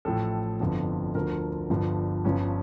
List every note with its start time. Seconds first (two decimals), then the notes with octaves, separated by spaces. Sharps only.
0.05 A1 A2 F3 A4
0.60 G1 F2 D3 F3
1.15 D2 D3 F3 A#4
1.70 G1 G2 D3 F3
2.24 G1 G2 F3 C#4